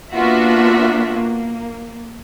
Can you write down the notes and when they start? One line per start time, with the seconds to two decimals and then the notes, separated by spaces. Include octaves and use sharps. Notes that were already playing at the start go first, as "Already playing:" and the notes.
0.14 A#3 B3 D4 F4 F#4 E5
1.15 A#3